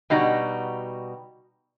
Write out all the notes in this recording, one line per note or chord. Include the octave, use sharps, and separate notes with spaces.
B2 G3 D#4 F#4